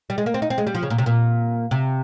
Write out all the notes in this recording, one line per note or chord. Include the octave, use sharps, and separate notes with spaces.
G3
G#3
A#3
C4
D#4
C4
G#3
G3
F3
C#3
A#2
C3
A#2
C3